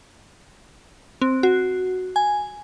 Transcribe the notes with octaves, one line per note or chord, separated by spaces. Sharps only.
C4
F#4
G#5